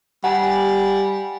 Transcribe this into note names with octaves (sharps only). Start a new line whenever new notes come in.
G3 F#5 G#5